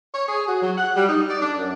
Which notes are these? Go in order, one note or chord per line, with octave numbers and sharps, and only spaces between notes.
C#5
G#4
F#4
F#3
F#5
G3
D#4
D5
D4
F#2